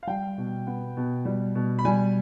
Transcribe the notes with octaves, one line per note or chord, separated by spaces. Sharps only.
F5
G3 G5
B2
B3
B2
G3
B2
B5
G3 G#5